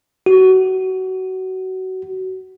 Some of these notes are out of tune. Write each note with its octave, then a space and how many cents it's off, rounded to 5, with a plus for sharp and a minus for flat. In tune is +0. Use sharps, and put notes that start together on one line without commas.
F#4 +25